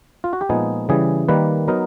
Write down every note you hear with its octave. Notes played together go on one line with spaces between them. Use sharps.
F4
F#4
G4
A#2 F3 G#3 B3 D#4 G#4
C#3 E3 G3 G#4
D#3 G3 A#3 B4
F#3 B3 D#4 A#4